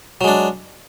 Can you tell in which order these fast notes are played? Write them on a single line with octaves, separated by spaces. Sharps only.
F#3 G#3 D4